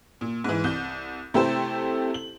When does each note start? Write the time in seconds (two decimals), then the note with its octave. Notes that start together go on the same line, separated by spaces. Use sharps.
0.21 A#2
0.44 G#2 E3
0.64 C2 G6
1.34 C3 A3 E4 G4 A4 C5
2.14 F#7